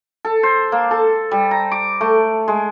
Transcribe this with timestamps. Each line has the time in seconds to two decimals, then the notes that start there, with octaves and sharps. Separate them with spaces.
0.25 A4
0.43 C5
0.72 A#3
0.91 A4
1.31 G3
1.51 A#5
1.72 D6
2.01 A3
2.48 G#3